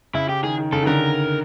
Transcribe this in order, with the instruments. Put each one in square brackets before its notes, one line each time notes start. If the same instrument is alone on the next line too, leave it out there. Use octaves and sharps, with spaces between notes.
[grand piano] C#3 [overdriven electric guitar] E4
[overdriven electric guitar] G4
[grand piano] D#3 [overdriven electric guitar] G#4
[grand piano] D#3
[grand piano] C#3 [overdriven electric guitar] A4
[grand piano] D#3
[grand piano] D3 [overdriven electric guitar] A#4